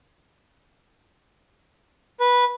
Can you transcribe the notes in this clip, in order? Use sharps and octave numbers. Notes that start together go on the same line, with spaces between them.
B4